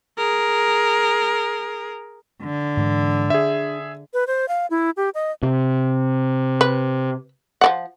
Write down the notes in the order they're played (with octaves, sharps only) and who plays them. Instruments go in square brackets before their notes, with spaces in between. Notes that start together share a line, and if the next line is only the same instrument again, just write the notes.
[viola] G#4 A#4
[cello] D3
[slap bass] G#2 E3
[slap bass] D4 [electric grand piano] G#4 E5
[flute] B4
C5
F5
E4
G4
D#5
[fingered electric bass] C3
[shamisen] B4
F3 D5 F#5